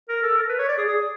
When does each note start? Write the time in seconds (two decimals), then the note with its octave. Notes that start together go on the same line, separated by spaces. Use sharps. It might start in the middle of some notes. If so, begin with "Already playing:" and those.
0.09 A#4
0.23 A4
0.36 A#4
0.49 B4
0.59 C#5
0.69 D5
0.78 G#4
0.88 G#4